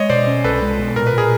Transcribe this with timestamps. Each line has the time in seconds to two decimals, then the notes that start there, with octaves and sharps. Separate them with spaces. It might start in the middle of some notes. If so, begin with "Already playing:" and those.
Already playing: G#3 C#5 D#5
0.10 B2 C5 D5
0.27 C#4
0.44 C2 A4 B4
0.62 G#3
0.79 B2
0.96 A#2 A#4
1.07 B4
1.14 A#2 G#4 A#4